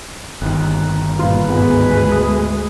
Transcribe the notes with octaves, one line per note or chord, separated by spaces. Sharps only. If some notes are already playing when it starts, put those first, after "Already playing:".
G1 D#3 F#6
G2 A#2 F4 B4
D2 G#2 G#3 B3
D#6